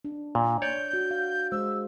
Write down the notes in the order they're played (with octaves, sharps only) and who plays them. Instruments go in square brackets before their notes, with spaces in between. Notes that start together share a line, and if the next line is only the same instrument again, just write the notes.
[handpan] D4
[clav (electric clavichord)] A#2
[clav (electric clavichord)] C#5 D5 [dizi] G6
[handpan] F#4
F5
[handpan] G#3 C5 [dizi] E6